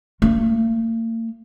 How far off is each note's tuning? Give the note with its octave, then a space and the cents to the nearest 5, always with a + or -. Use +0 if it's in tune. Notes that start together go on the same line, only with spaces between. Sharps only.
A#3 -45 F4 +15